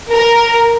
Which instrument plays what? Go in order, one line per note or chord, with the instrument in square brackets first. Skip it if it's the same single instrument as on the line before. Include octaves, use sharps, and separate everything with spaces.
[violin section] A#4